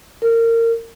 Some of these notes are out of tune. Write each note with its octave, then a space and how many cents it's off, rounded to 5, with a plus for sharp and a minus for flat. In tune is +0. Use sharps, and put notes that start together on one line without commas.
A#4 -25